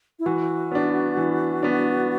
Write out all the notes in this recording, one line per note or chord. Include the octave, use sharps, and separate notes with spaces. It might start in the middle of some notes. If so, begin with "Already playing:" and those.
E4
E3 F#4
B3 D4
E3
B3 D4